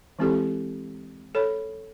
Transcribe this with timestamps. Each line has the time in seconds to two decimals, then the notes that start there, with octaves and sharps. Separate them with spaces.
0.19 E3 G#3 C4 E4 G4 A4
1.35 A4 C#5 B5